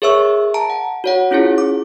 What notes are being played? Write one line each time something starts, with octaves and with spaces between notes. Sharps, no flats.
G#4 A#4 C#5 E5 C#6 E6
A5 A#5 D7
F#5
F#4 C#5 F#5
C#4 E4 F4 G#4 C#5
D6